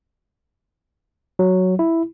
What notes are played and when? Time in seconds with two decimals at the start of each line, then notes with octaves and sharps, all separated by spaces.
1.39 F#3
1.79 E4